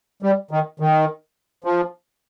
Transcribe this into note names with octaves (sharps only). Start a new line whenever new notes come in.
G3
D#3
D#3
F3